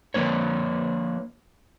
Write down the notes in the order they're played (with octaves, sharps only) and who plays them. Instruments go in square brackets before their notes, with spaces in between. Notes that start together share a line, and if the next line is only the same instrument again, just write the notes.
[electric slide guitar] F3 A#3 D4 C#5